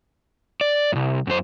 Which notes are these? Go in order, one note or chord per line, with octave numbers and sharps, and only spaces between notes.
D5
C2 F#2
F#2 C5